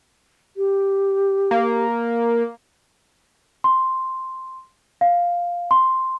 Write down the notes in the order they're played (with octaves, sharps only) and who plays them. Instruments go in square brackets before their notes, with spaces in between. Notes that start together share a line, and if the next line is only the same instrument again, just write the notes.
[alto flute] G4
[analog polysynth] A#3
[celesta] C6
F5
C6